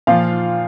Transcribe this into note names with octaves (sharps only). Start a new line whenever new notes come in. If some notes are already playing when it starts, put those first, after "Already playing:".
A#2 F3 F4 F5